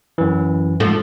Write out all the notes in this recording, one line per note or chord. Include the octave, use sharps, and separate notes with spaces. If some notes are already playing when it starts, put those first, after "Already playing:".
F#2 E3
G#2 F3 A3